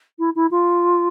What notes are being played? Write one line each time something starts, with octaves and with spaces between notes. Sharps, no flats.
E4
E4
F4